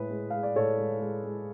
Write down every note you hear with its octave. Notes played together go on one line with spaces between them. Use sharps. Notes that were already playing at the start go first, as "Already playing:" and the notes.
Already playing: A2 G#3 G#4 B4
G#3
G#3 F5
D5
A2 A4 C#5
G#3
G#3
G#3